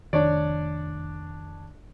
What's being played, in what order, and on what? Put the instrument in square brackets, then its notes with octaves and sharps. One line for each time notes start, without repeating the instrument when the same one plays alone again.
[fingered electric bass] F1 D#3 [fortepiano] D4 C#5 D5